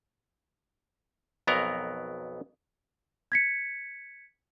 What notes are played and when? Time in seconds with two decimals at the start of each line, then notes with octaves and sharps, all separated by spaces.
1.47 B1 F2 F#3 B3 A#4 A#5
3.32 G#6 B6 C#7